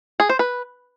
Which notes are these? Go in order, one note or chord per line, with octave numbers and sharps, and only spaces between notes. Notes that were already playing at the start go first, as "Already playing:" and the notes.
G#4
C5
B4